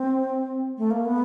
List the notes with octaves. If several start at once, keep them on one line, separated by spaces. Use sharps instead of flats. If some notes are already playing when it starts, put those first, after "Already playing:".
Already playing: C4
A3
A#3
B3